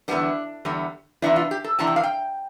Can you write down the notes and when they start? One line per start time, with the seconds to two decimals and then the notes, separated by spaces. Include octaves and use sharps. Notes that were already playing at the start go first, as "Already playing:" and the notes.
0.08 E2 D3 G3 B3 D4
0.65 E2 D3 G3 B3
1.22 C3 E3 B3 D4 E4
1.36 F4
1.51 G4
1.64 A4
1.79 C3 E3 B3 D4 A5
1.87 G5
1.96 F5
2.03 G5